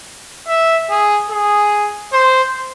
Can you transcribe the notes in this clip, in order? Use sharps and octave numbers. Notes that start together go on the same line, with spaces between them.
E5
G#4
G#4
C5